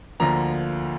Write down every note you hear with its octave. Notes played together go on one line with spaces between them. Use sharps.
D2 D3 F3 A#3 A#5